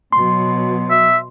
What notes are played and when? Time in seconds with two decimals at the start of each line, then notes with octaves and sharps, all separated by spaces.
0.13 B2 F#3 C6
0.90 E5